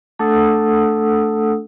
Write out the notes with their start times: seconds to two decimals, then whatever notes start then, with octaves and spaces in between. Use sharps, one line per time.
0.19 A3 D4 A4 F#5 D#6 E6